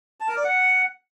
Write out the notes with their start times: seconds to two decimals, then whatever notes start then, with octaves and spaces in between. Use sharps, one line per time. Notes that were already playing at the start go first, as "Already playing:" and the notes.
0.20 A5
0.28 A#4
0.36 D5
0.44 F#5